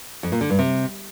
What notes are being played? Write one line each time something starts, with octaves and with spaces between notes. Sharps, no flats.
F2
A#2
D3
G2
C3